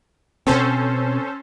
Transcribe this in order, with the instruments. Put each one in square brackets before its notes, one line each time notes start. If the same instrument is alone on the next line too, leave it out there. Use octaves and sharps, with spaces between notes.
[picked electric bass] B2 C4 [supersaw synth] C#4 A4 C5